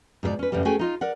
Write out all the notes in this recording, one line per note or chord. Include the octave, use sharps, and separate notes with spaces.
G#2 B2 A4 D5
C#4 B4
F#2 A2 C#3 G3
A3 C#4 F#4 G#4 G5 G#5
D#4 F4 D#5
A#4 D5 F#5